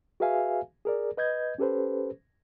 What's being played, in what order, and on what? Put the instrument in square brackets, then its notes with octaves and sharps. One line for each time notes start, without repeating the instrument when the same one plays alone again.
[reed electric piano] F#4 G#4 B4 E5 F5 G#5
G#4 A#4 D5
B4 D#5 G6 G#6
C#4 G4 A4 B4 C5